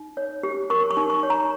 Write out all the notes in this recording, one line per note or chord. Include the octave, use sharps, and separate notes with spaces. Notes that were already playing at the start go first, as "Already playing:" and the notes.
Already playing: D#4
C#5
G4
A#4 C#6
C#6
D#4
C#6
C#5
A#5